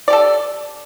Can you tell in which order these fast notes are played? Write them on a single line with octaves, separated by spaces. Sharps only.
D5 G4 A4